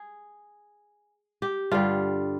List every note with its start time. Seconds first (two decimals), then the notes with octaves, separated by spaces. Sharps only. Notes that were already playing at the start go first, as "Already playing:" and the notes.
Already playing: G#4
1.42 G4
1.71 G2 D3 G3 F4